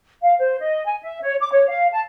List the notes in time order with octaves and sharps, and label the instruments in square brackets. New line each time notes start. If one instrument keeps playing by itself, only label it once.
[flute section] F5
C5
D#5
G#5
E5
C#5
D6
C#5
F5
A5